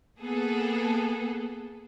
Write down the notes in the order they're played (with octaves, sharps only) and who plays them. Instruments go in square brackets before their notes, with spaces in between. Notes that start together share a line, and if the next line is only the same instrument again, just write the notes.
[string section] A#3 B3 G#4 A4